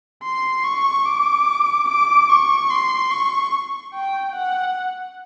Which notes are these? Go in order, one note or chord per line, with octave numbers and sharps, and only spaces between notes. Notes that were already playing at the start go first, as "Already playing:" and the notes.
C6
C#6
D6
D6
C#6
C6
C#6
G5
F#5